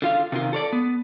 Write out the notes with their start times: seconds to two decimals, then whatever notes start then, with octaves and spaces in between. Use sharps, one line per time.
0.02 D3 F4 F5
0.32 C3 D#3 F4
0.53 A4 C#5 D5
0.73 B3